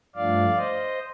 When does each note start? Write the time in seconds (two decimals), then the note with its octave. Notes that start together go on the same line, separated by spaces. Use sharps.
0.16 G2 F3 A3 D4 D5 F5
0.56 C5 D#5